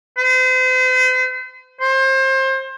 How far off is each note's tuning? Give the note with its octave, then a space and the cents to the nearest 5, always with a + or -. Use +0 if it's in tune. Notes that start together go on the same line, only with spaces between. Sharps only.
C5 -40
C5 +30